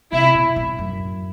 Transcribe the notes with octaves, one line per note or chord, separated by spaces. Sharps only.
C3 E4
B2
A2
F#2